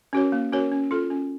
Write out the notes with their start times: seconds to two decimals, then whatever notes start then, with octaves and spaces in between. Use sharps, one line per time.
0.13 C#4 F#4 A#4 C#5
0.32 A#3
0.52 C#4 F#4 A#4 C#5
0.71 C#4
0.91 F4 A4
1.10 C#4